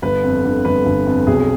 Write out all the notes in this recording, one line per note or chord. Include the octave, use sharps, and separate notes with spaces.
G1 B4
F2
D3
G1 B4
G1
F2
B1 G#4